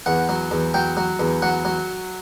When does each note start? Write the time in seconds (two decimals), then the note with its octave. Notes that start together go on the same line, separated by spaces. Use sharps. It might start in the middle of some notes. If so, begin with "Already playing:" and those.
0.06 E2 F#5
0.29 F#3
0.51 E2
0.74 F#3 G5
0.97 F#3
1.20 E2
1.42 F#3 F#5
1.65 F#3